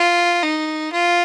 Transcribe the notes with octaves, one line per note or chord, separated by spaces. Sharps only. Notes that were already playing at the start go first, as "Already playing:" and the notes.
Already playing: F4
D#4
F4